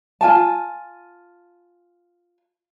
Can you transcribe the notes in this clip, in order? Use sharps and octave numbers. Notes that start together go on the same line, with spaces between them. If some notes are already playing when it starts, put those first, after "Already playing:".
F4 G#5 A5